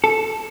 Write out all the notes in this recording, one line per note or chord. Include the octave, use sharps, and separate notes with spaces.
A4